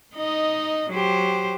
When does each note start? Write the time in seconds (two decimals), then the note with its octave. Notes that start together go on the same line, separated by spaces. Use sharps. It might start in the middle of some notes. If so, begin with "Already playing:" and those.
0.15 D#4 D#5
0.90 F#3 G4 C5